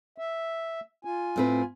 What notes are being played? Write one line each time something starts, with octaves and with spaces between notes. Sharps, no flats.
E5
F4 G#5
A2 C4 B4